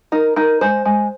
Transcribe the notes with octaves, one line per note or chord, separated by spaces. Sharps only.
D#4 A#4
D#4 A#4
G#3 C5
G#3